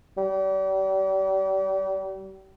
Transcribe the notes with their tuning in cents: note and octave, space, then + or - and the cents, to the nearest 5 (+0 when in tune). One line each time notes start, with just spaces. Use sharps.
G3 -35